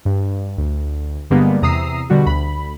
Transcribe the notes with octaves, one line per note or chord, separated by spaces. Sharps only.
G2
D2
G2 D3 G3 G#3 A#3 B3
E2 C3 A#5 D#6 E6 C7
B2 D3 G3 F#4
D2 B5